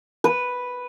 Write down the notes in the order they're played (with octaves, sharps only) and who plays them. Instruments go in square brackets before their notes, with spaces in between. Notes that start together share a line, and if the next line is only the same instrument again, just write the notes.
[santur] B4